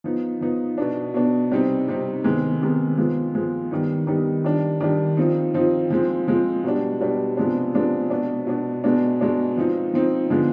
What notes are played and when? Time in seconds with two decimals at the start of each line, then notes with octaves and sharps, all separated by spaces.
0.04 F3 B3 D#4
0.41 F3 B3 D#4
0.78 B2 B3 D4
1.14 B2 B3 D4
1.51 C3 G3 C4 D#4
1.88 C3 G3 C4 D#4
2.24 C3 D#3 G#3 B3
2.61 C3 D#3 G#3 B3
2.97 F3 G#3 B3
3.35 F3 G#3 B3
3.71 D#3 G3 B3 D#4
4.07 D#3 G3 B3 D#4
4.44 D#3 G3 D4
4.80 D#3 G3 D4
5.17 F3 C4 D#4
5.54 F3 C4 D#4
5.90 F3 G#3 C4
6.28 F3 G#3 C4
6.64 B2 G3 D4
7.00 B2 G3 D4
7.37 C3 F3 G#3 B3 D4
7.74 C3 F3 G#3 B3 D4
8.10 B2 B3 D4
8.47 B2 B3 D4
8.84 B2 G#3 B3 D4
9.21 B2 G#3 B3 D4
9.57 F3 C4 D#4
9.94 F3 C4 D#4
10.30 D3 F3 G#3 B3